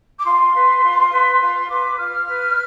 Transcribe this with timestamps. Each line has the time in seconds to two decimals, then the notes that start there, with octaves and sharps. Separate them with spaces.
0.18 D6
0.25 F4 C6
0.54 B4
0.82 F4
1.11 B4
1.40 F4 C6
1.69 B4 D6
1.98 F4 F6
2.27 B4